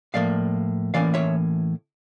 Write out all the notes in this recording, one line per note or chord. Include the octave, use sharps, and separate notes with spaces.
A2 F3 A#3 D5 F5
A2 E3 A#3 C#4 D5 F5
C#5 E5